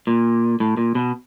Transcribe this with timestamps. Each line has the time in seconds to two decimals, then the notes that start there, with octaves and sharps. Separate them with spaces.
0.07 A#2
0.60 A2
0.77 A#2
0.95 B2